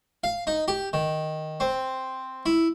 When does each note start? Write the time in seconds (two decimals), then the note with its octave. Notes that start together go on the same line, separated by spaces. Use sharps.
0.24 F5
0.47 D#4
0.68 G4
0.93 D#3
1.60 C4
2.46 E4